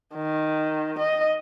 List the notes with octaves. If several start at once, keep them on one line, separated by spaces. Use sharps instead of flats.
D#3
D#5